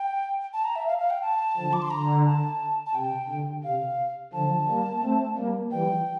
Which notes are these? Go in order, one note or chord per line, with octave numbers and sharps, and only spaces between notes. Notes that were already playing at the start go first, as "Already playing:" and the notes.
Already playing: G5
A5
A#5
E5
F5
F5
G5
A5
D3 F3
D6
C6
D3 A#5
A5
A5
C3 G5
D3
C3 F5
D3 F3 A5
G3 A#3
A3 C4
G3 A#3
E3 G3 G5